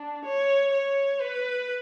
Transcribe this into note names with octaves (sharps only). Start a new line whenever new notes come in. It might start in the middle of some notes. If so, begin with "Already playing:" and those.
Already playing: D4
C#5
C#5
B4